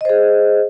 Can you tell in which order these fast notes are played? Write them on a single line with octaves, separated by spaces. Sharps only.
D#5 C5 G#4